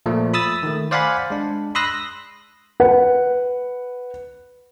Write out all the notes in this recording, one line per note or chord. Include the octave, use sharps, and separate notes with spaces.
A#2 F3 A3
B5 D#6 E6 A6
D#3 A3
C5 D5 F5 F#5 G#5 B5
G#3 D4
B5 C6 D#6 E6 F#6 A#6
B4 F#5